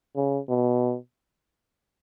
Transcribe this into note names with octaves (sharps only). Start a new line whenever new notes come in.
C#3
B2